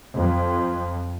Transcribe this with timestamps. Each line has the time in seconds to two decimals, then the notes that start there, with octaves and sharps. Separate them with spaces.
0.17 F2